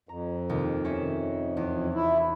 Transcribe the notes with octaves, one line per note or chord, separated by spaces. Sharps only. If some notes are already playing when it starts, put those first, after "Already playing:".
F2 A#5
D#2 C3 D#4
C#4 D#4 E5
E2
E4